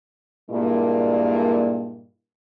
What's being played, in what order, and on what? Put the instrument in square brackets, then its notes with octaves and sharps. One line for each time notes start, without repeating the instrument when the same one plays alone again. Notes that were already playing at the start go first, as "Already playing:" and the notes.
[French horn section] G2 A#2 G#3 A#3 E4